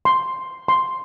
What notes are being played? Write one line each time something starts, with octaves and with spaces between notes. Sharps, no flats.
C6
C6